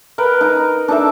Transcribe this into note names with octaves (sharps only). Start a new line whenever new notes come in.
A#4 B4 G5
D#4 A#5
D4 D#4 A4 E5